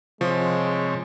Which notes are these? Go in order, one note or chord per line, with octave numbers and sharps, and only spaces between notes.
C3 F3 G#3 C#5